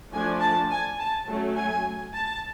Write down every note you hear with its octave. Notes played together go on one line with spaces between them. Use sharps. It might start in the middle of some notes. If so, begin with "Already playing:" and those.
F3 A3 D4 G#5
A5
G#5
A5
F#3 A3 C#4
G#5
A5